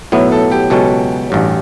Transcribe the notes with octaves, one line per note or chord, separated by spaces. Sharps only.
B1 A2 F#3 B3 E4
A4
G4
C#2 B2 F#3 C#4 A4
A1 G2 F#3